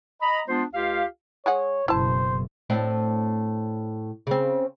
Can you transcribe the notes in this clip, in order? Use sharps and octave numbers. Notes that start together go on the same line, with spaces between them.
D#5 A#5 B5
G#3 B3 D4 F4 C5
C#2 F4 G4 F5
G#3 G#4 C#5 F#5
F#1 B2 E4 C5 A5
A2 C4 D4
C#3 C4